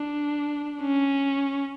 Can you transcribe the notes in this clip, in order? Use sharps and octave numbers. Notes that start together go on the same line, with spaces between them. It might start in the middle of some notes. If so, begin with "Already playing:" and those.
Already playing: D4
C#4